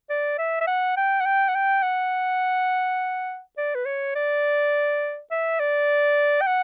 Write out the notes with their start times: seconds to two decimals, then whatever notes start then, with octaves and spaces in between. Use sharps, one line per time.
0.10 D5
0.38 E5
0.61 E5
0.67 F#5
0.97 G5
1.20 F#5
1.26 G5
1.49 F#5
1.55 G5
1.83 F#5
3.57 D5
3.75 B4
3.85 C#5
4.15 D5
5.31 E5
5.60 D5
6.41 G5
6.47 F#5